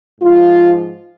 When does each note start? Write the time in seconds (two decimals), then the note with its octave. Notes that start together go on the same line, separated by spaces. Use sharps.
0.21 G#2 F3 F4